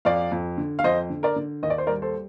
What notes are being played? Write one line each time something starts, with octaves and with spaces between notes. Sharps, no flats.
F2 D5 F5
F2
D3
F5
F2 C5 D#5
D3
A#4 D5
D3
D#2 D#5
D5
C5
G3 A#4 D5
A4 C5